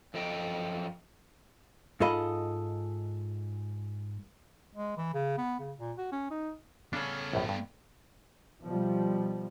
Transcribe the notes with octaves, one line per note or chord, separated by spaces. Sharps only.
F#2 F3 A4 D#5 G5
G#2 F4 A4 D#5 B5
G#3
E3
C#3
B3
C#3
A#2
F#4
C#4
D#4
C#3 B3 C#4 D4 A4
A#1 F#2 A2
G2
B2 F3 G3